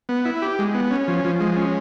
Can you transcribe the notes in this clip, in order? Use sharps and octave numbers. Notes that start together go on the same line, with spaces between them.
B3
E4
G4
G#3
B3
C#4
F3
F3
G#3
C#4